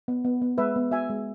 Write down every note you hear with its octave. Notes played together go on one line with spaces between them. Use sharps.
B3
B3
B3
G#3 B4 E5
B3
F#4 E5 G#5
G#3